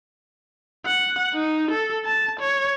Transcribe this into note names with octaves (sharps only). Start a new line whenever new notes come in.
F#5
D#4
A4
A5
C#5